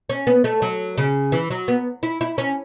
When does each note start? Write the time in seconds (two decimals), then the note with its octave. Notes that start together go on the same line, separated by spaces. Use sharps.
0.09 C#4
0.27 B3
0.44 A3
0.62 F#3
0.97 C#3
1.32 E3
1.50 F#3
1.68 B3
2.03 E4
2.21 E4
2.38 C#4